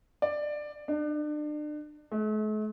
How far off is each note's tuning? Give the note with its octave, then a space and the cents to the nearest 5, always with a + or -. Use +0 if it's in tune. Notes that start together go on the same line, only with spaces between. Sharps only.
D5 +15
D4 +35
A3 -45